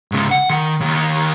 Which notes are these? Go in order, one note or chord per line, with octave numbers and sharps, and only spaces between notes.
G#2 C#3
F#5
D#3
D#2